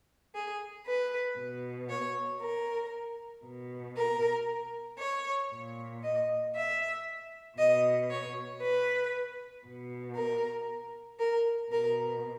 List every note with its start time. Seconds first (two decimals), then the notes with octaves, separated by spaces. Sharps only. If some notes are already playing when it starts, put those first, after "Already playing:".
0.36 G#4
0.88 B4
1.38 B2
1.90 C#5
2.42 A#4
3.45 B2
3.97 A#4
5.00 C#5
5.52 A#2
6.04 D#5
6.56 E5
7.58 B2 D#5
8.10 C#5
8.62 B4
9.66 B2
10.16 A#4
11.20 A#4
11.72 B2 A#4